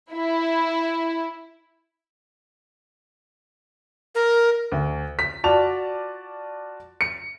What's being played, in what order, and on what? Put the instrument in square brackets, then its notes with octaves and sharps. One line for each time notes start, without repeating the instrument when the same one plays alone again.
[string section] E4
[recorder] A#4
[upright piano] D2
B6
F4 F#4 D5 A5 F7
C#7